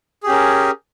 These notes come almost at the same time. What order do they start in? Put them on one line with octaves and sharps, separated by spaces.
G#4 G4 C#4 A#4